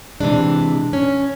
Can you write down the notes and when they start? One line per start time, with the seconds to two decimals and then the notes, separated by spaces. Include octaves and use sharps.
0.20 C3 E3 G#3 D4
0.93 C#4